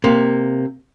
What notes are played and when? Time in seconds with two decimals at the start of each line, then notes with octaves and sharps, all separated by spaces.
0.04 C3 A#3